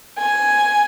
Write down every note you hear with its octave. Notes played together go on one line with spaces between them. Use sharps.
G#5